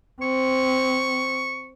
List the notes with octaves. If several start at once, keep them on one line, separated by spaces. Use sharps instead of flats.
C4 C#6